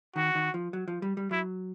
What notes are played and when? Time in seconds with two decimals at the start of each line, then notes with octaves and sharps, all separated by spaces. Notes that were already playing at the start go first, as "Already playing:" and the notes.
0.16 D#3 F#4
0.35 D#3
0.54 F3
0.73 F#3
0.88 F3
1.02 G3
1.17 G3
1.31 F#3 E4